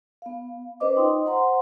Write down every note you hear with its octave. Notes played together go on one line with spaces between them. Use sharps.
B3 F5
C#4 B4 C5 D#5 D6
D#4 F4 D#5 G5 C6 D#6
C5 F#5 A#5 C6